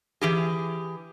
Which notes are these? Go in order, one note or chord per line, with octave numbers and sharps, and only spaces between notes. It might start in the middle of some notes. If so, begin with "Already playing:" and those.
E3 G4 G#4